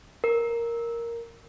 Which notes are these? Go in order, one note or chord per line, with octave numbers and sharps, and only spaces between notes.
A#4